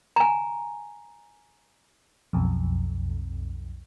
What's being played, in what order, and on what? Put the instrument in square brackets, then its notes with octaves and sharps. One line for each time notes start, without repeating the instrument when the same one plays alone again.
[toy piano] G#5 A#5
[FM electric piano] B1 F2